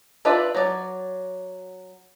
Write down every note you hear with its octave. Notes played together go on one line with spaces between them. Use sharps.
D4 F4 B4 D5 E5
F#3 D5